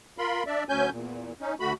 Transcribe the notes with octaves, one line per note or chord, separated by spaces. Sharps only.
F4 A#4 B5 C6
D4 D5 E5
D2 F#3 C#4 G#5 G6
E2 A#2
C#4 D#4
D2 A3 F#4 B5